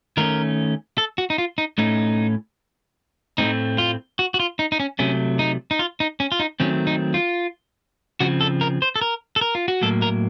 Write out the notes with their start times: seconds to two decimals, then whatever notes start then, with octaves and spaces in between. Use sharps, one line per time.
0.17 D#3 A3 C#4 A#4
0.98 A4
1.18 F#4
1.30 D#4
1.38 F4
1.58 D#4
1.78 A2 A3 C#4 D#4
3.38 A2 A3 C4 D#4
3.78 F4
4.19 F#4
4.34 F#4
4.40 F4
4.59 D#4
4.72 D#4
4.80 C#4
4.99 C3 F#3 A3 C#4
5.39 D#4
5.71 D#4
5.79 F4
6.00 D#4
6.20 C#4
6.32 F4
6.40 D#4
6.60 D#3 F#3 A3 C4 C#4
6.87 D#4
7.14 F4
8.20 C#3 F3 C4 F#4
8.41 A4
8.61 A#4
8.82 C5
8.96 A4
9.01 A#4
9.36 A4
9.41 A#4
9.55 F4
9.68 F#4
9.82 A2 F#3 A#3 A4
10.02 A#4